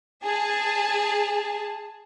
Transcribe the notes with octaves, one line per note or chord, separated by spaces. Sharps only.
G#4 A5